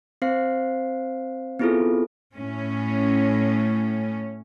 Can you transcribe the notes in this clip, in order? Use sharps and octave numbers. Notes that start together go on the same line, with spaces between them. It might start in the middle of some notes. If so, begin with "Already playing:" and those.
C4 C5 F5 C7
B3 C4 E4 F4 G#4 A4
A2 C#4